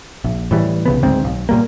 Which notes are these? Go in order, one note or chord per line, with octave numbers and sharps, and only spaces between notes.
A#1
A2 E3 G3
B1 C#3 B3
D1 D2 G#2 C4
B1
A#2 G3 A#3